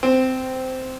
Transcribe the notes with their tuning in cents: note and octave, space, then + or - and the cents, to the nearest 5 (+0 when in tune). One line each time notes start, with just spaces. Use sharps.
C4 -15